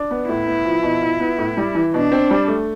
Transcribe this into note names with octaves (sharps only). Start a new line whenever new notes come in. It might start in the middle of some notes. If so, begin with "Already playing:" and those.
Already playing: D4
B3
A2 E4
B3
F3
B2
F4
B3
A2
G3
E3
B2 D4
C4
G3
A3